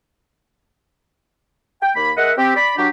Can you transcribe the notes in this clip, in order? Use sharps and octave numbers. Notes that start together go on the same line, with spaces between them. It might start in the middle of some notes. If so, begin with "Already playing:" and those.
G5
D#2 A#3 B5
G#3 A#4 D#5 E5 F#5
C4 G4
D5 B5
F#3 D4 G4